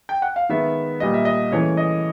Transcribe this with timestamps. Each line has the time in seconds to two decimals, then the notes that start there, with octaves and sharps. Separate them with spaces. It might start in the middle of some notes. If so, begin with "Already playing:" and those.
0.09 G5
0.22 F#5
0.36 F5
0.49 D#3 G#3 B3 E5
1.00 A#2 G3 A#3 D#5
1.14 E5
1.25 D#5
1.52 C#3 E3 A3 C#5
1.77 D#5